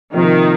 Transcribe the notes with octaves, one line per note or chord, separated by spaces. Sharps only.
C3 D#3 F3 A#3